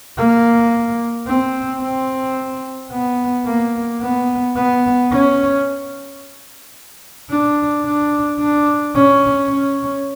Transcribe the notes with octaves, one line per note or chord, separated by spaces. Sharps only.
A#3
C4
C4
B3
A#3
B3
B3
C#4
D4
D4
D4
C#4
C#4